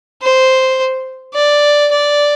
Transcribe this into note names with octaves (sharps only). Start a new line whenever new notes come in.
C5
D5
D5